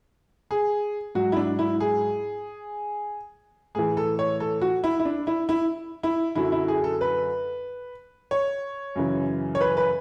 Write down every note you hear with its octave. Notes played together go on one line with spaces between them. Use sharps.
G#4
G#2 F#3 F#4
E4
D4
E4
G#4
A2 E3 G#4
A4
C#5
A4
F#4
E4
E4
D4
E4
E4
E4
F#2 D3 F#3 E4
E4
G#4
A4
B4
C#5
F#2 C#3 E3
C#5
B4
B4